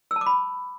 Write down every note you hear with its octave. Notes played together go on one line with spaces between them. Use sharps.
E6
A5
D6
B5